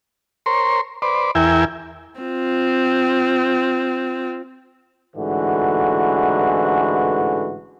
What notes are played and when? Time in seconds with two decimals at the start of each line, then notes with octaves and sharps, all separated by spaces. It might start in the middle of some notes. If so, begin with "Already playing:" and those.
0.46 A#4 C5 C#5 C6
1.02 B4 C5 D5
1.35 E2 E4 A#4 E5 G5 G#5
2.21 C4 F4
5.16 A1 G#2 D3 E3 F#4